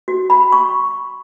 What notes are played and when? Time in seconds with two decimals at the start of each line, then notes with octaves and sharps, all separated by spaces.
0.08 F#4
0.30 B5
0.53 C#6